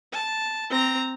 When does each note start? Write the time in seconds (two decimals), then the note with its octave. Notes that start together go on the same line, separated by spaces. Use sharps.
0.12 A5
0.70 C4 A#5